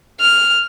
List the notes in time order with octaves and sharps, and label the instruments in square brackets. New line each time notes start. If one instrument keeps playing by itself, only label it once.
[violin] F6